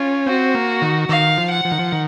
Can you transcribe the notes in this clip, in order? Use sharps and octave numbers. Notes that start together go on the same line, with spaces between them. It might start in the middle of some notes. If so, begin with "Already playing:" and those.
Already playing: C#4 F4
C4 F#4
A#3
D#3
D#3 F5
F3
F#5
F3
D#3
F3
D#3